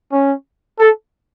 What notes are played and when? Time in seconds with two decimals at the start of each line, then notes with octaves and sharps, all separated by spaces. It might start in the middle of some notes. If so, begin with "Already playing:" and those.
0.13 C#4
0.80 A4